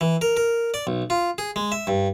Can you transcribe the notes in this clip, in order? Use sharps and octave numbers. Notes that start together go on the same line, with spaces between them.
E3
A#4
A#4
D5
B1
F4
G#4
G#3
E5
G2